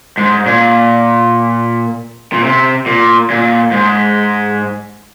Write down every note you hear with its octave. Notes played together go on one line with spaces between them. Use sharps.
G#2
A#2
A#2
C3
A#2
A#2
G#2